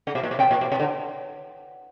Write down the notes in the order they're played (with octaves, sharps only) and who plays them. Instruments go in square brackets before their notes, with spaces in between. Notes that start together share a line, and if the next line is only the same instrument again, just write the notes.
[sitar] C#3 [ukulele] F#5
[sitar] B2
A#2
B2
[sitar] C3 [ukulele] G5
[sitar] A#2
B2
C3
D3